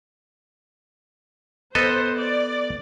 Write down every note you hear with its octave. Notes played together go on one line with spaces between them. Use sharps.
B3 A4 C5 D#5
D5